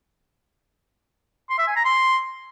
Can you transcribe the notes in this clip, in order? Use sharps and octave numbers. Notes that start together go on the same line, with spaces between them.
C6
E5
G#5
A#5
C6